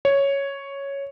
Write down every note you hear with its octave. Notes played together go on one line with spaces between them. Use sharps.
C#5